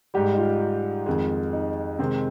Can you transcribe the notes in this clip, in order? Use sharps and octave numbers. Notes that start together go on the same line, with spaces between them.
G#2 G3 G4
D#4
F4
F2 D#3 G#3
D#4
C3 D#3 G#3 C4